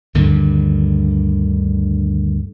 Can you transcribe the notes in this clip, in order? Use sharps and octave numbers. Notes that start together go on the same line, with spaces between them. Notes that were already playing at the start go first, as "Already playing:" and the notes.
D2 G2 D3 D#3